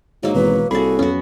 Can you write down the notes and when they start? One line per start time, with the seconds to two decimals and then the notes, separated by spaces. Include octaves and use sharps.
0.23 G#2 F#3 A#3 D#4
0.34 G#1 B2 E3 G#3 B4
0.71 C2 F#4 G#4 A4 B5
0.99 F2 F#3 B3 C#4 F#4